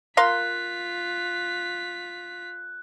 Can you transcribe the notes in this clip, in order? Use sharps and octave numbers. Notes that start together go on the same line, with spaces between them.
F4 A#4 F5 C6 F#6 B6